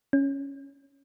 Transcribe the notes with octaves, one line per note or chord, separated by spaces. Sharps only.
C#4